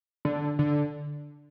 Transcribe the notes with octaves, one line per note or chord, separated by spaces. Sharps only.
D3
D3